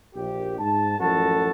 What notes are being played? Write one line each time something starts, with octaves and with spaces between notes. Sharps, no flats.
A#1 G4
G#2 A5
A1 F#2 F3 F#4 A4 A5